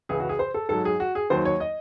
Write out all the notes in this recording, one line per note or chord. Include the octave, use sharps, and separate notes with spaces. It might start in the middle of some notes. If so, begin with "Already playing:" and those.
C#2 C#3 E3 G#4
F#4
G#4
C5
A4
G#2 F#3 A4
G#4
F#4
G#4
D#2 D#3 F#3 C5
C#5
D#5